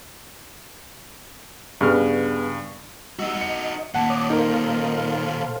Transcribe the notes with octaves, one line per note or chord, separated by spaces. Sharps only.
G2 C#3 B3 F6
G3 D#4 F#4 D#5 E6
D#5 C#7
D#2 A#2 F#5 A5
C#5 D6 D#6
D#4 A4 A#4 C5 F5